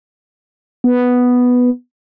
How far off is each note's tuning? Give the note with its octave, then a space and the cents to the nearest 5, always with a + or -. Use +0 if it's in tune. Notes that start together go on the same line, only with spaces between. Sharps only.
B3 +0